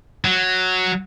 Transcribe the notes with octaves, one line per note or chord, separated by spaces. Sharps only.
F#3